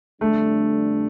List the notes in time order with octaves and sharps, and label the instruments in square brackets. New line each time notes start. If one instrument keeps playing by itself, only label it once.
[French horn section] F2 D3 G3 D4 [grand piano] A3